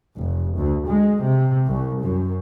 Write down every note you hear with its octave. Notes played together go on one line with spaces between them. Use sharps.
F1
D2
G#3
C3
C2
F#2